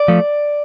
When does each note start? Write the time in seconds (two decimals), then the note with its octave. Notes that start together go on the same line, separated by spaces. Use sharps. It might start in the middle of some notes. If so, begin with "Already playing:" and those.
Already playing: D5
0.08 F3 A3